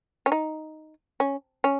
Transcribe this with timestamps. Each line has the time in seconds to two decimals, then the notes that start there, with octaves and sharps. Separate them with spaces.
0.26 C#4
0.32 D#4
1.20 C#4
1.64 C#4